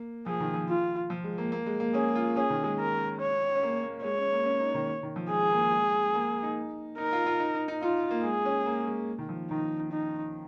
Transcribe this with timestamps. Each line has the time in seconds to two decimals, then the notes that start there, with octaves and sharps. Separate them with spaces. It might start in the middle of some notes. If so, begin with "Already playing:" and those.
Already playing: A#3
0.26 F3 G#4
0.40 D#3
0.54 F3
0.69 F4
1.10 F3
1.24 G#3
1.38 A#3
1.52 A#3
1.66 G#3
1.80 A#3
1.94 C#4 G#4
2.15 F4
2.36 C#4 G#4
2.50 D#3
2.64 G#3
2.79 A#4
3.20 C#5
3.55 C#4
3.63 A#3
3.83 A#3
4.04 G#3 C#5
4.18 C#4
4.32 A#3
4.46 C#4
4.60 D#4
4.74 D#3
5.03 D#3
5.16 F3
5.30 G#3 G#4
5.51 A#3
5.72 G#3
6.14 A#3
6.43 D#4
6.98 D#4 A#4
7.13 F4
7.26 F4
7.40 D#4
7.55 D#4
7.68 D#4
7.82 D#4 F4
8.11 A#3
8.24 G#3 G#4
8.45 C#4
8.66 A#3
8.87 G#3
9.18 D#3
9.29 F3
9.50 D#3 D#4
9.92 D#4